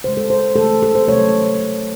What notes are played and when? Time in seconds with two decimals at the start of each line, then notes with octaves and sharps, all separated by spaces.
0.04 C#3 G#3 C5
0.17 A4
0.30 C5
0.56 C#3 E3 A3 A4
0.83 A4
0.95 C5
1.08 C3 D#3 F#3 A3 C#5